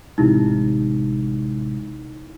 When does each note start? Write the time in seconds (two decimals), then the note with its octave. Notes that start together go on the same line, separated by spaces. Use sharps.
0.18 A1 C3 G#3 D#4 E4